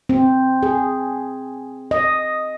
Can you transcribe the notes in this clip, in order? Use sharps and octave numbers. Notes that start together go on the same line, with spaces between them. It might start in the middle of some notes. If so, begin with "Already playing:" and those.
C4
G#4
D#5